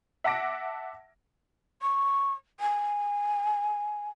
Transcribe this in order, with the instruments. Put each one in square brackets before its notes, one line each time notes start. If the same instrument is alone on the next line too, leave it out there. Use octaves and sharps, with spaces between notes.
[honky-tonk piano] E5 F#5 A5 D6 A#6 D7
[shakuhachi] C#6
G#5